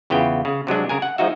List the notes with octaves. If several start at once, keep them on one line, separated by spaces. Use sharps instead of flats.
E2 C#3 B3 F4 G5
C#3
C3 F#3 G#3 D4
C#3 A#4 G#5
F#5
F3 G#3 D#4 F#4 E5